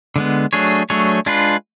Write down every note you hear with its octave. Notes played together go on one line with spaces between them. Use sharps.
D3 G#3 B3
F#3 A3 D4 G#4 C#5
F#3 A3 D4 G#4 C#5
G#3 D4 F4 B4